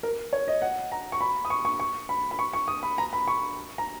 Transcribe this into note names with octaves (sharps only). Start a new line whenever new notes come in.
A#4
C#5
D#5
F#5
A#5
C#6
B5
D#6
C#6
C#6
C#6
B5
B5
C#6
C#6
D#6
B5
A#5
B5
C#6
A#5